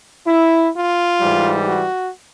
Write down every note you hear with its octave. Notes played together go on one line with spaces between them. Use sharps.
E4
F4
G#2 E3 G3
F#4